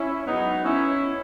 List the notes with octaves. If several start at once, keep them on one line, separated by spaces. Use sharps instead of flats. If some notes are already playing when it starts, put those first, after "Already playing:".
Already playing: C#4 E4
G#2 F#3 B3 D#4
C#4 E4